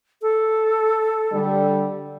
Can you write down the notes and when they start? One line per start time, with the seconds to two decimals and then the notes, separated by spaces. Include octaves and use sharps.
0.22 A4
1.32 D3 G3